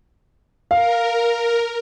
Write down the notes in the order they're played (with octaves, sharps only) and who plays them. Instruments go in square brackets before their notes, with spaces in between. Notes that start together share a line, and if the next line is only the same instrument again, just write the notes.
[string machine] A#4 [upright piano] F5